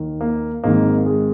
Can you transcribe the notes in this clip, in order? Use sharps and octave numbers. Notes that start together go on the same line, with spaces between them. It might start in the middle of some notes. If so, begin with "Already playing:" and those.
Already playing: D#2 D#3
A#3
G#1 G#2 D#3 A#3
G#3